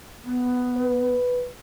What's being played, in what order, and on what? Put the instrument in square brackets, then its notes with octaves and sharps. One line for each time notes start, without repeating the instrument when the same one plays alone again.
[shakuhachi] B3
[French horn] B4